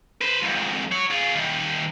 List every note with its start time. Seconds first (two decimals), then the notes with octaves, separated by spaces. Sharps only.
0.21 B4 C5
0.42 F2 G#2
0.92 C#5 F#5
1.10 F4 G#4
1.36 D#3 G3